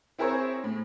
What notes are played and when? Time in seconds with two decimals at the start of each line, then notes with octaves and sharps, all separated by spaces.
0.19 C4 E4 G#4 A#4 C5 C#5
0.64 A2